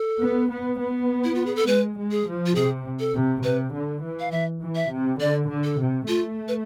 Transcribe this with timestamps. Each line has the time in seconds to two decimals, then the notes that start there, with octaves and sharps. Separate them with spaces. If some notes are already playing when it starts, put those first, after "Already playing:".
Already playing: A4
0.19 B3
0.49 B3
0.78 B3
1.24 E4
1.35 F4
1.46 G#4
1.56 A4
1.67 G#3 B4
1.96 G#3
2.11 G#4
2.26 F3
2.46 F4
2.55 C3 G#4
3.00 A4
3.14 C3
3.43 C3 B4
3.73 D3
4.02 E3
4.20 F5
4.31 E5
4.62 E3
4.75 E5
4.91 C3
5.20 D3 D5
5.49 D3
5.64 A4
5.79 C3
6.08 A3 F4
6.48 B4